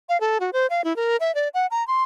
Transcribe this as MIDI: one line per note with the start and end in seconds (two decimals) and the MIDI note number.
0.09 0.20 77
0.21 0.38 69
0.40 0.51 66
0.53 0.67 72
0.70 0.84 77
0.84 0.95 64
0.96 1.17 70
1.20 1.34 76
1.35 1.48 74
1.54 1.67 78
1.71 1.86 82
1.88 2.03 84